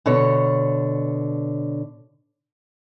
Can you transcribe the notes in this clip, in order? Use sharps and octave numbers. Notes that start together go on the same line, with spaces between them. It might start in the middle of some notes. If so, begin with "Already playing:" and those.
B2 D3 C#5